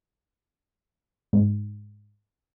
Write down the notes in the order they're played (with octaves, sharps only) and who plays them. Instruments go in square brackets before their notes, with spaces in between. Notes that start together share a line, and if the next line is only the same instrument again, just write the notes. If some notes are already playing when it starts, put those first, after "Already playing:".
[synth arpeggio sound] G#2